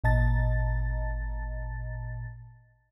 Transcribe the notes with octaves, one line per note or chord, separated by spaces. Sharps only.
G#1 A#2 D#5 A5 A#5 A6